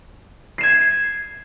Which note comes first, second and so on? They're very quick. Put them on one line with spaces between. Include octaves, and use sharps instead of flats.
C7 E7 G#6